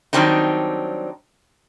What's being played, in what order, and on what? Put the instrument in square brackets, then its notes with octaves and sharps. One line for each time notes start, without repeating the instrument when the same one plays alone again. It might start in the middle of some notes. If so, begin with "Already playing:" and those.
[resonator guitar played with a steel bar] D#3 F#3 G3 C4 D4 D#4